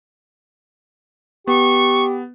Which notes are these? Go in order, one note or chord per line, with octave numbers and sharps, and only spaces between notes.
B3 G4 C#6